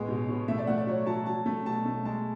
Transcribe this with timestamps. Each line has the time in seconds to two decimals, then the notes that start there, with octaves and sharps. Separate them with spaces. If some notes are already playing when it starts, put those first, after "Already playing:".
Already playing: A2 G#3 B3
0.08 B2
0.29 B2
0.48 A3 E5
0.58 D5
0.67 A3 F#5
0.78 D5
0.87 F#3 C#5
1.06 F#3 A5
1.26 F#3 A5
1.46 A3
1.66 B2 A5
1.86 A3
2.05 G#3 A5